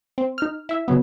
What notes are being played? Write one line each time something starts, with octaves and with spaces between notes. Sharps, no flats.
C4
D#4 F6
E4 E5
C#3 F#3 B3